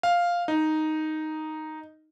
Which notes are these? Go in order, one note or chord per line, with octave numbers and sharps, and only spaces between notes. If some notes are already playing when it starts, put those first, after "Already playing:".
F5
D#4